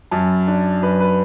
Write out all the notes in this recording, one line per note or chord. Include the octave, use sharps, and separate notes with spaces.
F#2 A5
D4
F#2 B4
B4